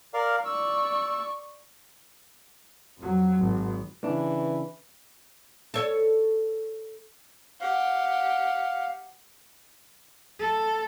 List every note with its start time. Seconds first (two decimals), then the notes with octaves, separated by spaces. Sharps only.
0.14 A#4 D5 F5
0.45 D5 C#6 E6
2.98 F2 F#3
3.38 G#1
4.04 C#3 E3 D4
5.74 A4 C#5
7.61 G4 F5 F#5
10.40 A4